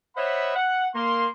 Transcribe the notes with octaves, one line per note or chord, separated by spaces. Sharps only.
C5 C#5 D#5 E5 F#5 B5
F#5
A#3 C6